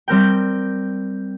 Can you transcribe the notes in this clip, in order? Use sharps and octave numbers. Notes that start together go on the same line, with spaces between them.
G3 C4 A#4 G5